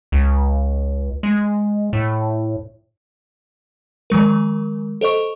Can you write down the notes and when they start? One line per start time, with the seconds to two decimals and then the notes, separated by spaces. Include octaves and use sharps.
0.12 C#2
1.23 G#3
1.93 A2
4.10 D#3 F3 G#3 A#4
5.01 A4 C5 D#5 C#6